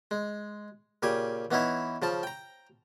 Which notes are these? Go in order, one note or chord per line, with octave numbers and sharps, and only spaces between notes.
G#3
A#2 C#3 G4 G#5
E3 B3 C#4 D#4 E4
C#3 F3 A5
G5 A#5